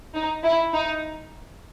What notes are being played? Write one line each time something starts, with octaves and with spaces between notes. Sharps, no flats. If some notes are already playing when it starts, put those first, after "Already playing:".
D#4
E4
D#4